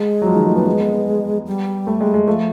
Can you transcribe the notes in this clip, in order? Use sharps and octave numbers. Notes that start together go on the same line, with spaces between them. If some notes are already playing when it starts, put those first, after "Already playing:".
Already playing: G#3
F#3
F3
D#3
A3
G3 B3
G#3 B3
B3
B3
G3
A3
G#3
G#3
F3 A3